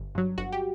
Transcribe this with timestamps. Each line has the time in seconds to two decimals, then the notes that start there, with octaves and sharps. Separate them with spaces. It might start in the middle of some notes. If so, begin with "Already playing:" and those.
Already playing: G1
0.15 G2 F#3
0.38 G1 F#4
0.52 G4